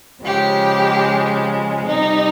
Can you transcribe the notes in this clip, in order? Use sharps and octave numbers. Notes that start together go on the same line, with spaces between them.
C#3 F3 G#3 G4
C3 G3 D#4